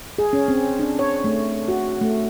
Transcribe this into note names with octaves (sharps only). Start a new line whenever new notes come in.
G#4
C#4
C4
D4
C#5
A3
F#4
A3